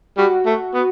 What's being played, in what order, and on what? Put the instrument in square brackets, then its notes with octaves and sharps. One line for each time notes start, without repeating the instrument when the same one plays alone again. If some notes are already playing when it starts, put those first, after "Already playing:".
[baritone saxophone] G3 [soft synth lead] F#4
[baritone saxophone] A3
B3